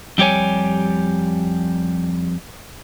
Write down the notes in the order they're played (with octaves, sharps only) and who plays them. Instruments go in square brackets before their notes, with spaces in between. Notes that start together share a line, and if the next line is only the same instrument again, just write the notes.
[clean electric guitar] F2 G3 G4 C#5 G#5